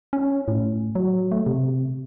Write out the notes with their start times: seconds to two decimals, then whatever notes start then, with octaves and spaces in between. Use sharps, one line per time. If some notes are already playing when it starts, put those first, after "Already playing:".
0.13 C#4
0.48 A2
0.95 F#3
1.32 A3
1.46 C3